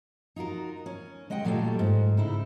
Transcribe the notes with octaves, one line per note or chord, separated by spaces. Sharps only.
D#4 F4 F#4 A#4
C#4
G#3 D#5 F#5 G5
A#2 F#3 G3 A3 F4 G5
G#2
C#3 D#4 E4